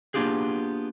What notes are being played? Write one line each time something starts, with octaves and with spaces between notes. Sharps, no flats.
A#3 B3 D4 F4 G4 G#4